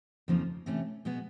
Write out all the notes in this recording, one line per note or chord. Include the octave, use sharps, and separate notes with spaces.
F2 C#3 F3 A#3 D#4
C3 E3 A3 C#4
B2 G#3 B3